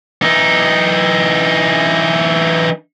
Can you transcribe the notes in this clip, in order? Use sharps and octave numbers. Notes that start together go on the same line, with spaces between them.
E3 D#4